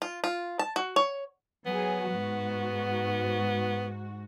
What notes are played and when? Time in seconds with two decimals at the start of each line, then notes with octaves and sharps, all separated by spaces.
0.02 F4
0.24 F4
0.59 A5
0.76 F#4
0.96 C#5
1.66 F#3 B3 G#4
2.08 G#2 F#4